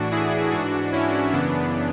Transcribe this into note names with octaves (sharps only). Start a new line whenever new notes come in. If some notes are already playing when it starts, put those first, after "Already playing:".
Already playing: A2 E3 D4 F#4
E4 G#4
G#2 E3 D4 F#4
C#4 E4
F#2 C#3 E3 B3 D4